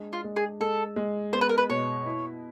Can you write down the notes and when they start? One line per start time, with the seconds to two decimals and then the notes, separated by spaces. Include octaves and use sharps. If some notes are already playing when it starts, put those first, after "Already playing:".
Already playing: G#3 D4
0.13 F4
0.24 G#3
0.36 G#4
0.60 G#3 A4
0.96 G#3
1.33 B3 C5
1.41 B4
1.49 A#4
1.58 B4
1.69 B2 C#5
2.06 E4